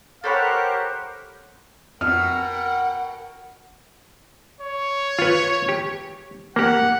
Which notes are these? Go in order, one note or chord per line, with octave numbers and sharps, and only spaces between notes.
G4 A4 A#4 C5 C#5 F#5 B5
F2 B2 A#4 F#5 G5 F6
C#5
F4 B4
G4
A#3 G4 F#5